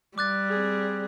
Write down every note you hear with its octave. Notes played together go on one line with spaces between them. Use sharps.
G3 D6 F#6 A6
C4 G#4